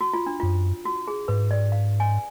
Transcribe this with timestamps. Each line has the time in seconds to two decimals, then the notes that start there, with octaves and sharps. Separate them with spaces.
0.01 F#4
0.13 F4
0.26 D4
0.40 F#2 F4
0.85 F#4
1.08 G#4
1.28 G#2 B4
1.51 D5
1.72 F5
2.00 G#5